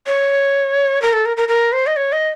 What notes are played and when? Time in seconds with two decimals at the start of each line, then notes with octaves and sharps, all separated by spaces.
0.07 C#5
1.02 A#4
1.13 A4
1.26 A#4
1.37 A#4
1.48 A#4
1.73 C5
1.87 D#5
1.96 C#5
2.12 D#5